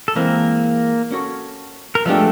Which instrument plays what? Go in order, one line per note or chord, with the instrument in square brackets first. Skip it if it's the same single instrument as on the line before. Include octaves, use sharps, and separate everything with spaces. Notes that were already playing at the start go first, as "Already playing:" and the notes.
[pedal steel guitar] A4
[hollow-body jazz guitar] E3 G#3 C4 [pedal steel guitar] A#3 A#4
[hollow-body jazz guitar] A#3 C#4 F#4 A4 C#5
[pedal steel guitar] A#4
[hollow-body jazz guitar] F3 G#3 B3 D4 G4 [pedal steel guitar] A3 A4